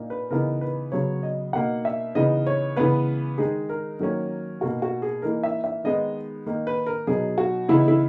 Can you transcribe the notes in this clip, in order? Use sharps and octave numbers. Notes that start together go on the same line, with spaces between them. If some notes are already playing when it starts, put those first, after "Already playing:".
Already playing: A#2 A#3 D#4
B4
C#3 E3 B3 D#4 A#4
B4
C#3 F#3 B3 C#5
D#5
B2 A#3 D#4 F#5
E5
C#3 E3 B3 D#4 D#5
C#5
C#3 E3 G#3 B3 B4
D#3 G#3 D#4 G#4
A#4
D#3 F#3 A#3 C#4
B2 A#3 D#4 F#4
F#4
G#4
E3 A#3 D#4 A#4
E5
E5
D#3 G#3 B3 D#4 D#5
D#3 A#3 D#4
B4
A#4
B2 F#3 B3 D#4 G#4
F#4
C#3 E3 B3 D#4 E4
E4